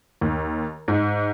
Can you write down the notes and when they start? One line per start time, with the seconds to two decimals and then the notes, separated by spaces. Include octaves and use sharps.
0.21 D#2
0.88 G#2